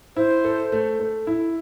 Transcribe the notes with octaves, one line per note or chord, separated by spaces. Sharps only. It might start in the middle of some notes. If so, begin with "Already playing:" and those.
E4 C5
A4
A3
A3
E4